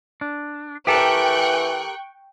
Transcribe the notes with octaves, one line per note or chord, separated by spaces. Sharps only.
D4
E3 G4 A4 A#4 G5 C#6 F#6